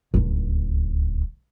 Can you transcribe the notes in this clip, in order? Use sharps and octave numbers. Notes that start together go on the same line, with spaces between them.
D1 C#2